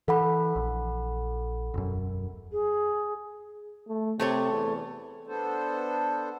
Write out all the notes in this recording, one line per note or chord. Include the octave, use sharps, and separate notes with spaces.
E3 A4 F#5 B5
A#1
E1 F#2
G#4
A3
C3 A3 A4 C#5
E2
B3 D4 A4 C5